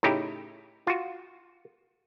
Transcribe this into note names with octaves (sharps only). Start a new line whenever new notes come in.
A2 C#3 D#4 E4 G4
F4 F#4